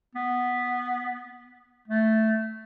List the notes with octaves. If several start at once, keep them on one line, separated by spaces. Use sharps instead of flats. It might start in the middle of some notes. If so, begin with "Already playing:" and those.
B3
A3